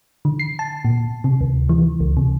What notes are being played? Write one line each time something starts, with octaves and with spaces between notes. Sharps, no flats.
D3
C7
A5
A#2
C3
D2
E3
C#2
C3